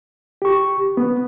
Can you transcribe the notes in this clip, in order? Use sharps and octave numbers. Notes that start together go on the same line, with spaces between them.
G4 C#6
B3